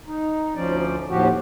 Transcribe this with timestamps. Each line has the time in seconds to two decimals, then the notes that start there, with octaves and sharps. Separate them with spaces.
0.07 D#4
0.55 D2 F3 C#4 D5
1.09 D#2 A2 F3 F#4 G4